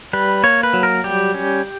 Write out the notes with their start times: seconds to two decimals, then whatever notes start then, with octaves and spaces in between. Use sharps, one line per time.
0.13 G3 B4
0.44 A#3 C#5
0.63 B4
0.73 F#3
0.83 A#4
1.04 G3 G4
1.34 C#4